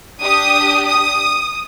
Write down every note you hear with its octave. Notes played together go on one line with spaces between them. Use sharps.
D4 G4 D#6
D#6